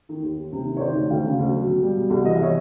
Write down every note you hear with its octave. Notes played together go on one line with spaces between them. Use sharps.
D#3
D#2
D#2
C3
D#3
C#5
D#3 C5 D5
D2
D2 F5 G5
C#3
D2
F#3
B2
G3
B2
C2
E3 D#5
E5
E3 C#5 D#5